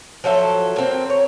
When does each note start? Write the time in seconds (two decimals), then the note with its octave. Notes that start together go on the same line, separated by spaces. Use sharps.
0.24 F3 F#3 A4 E5
0.76 A#3 C4
1.10 C#5